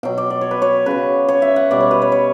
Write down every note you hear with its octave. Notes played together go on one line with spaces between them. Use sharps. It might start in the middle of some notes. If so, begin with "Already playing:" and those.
B2 F#3 G5
D5
D5
C#5
B4
C#5
C#3 F#3 B4
C#5
E5
F#5
B2 G3 D5
C#5
B4
C#5
C#5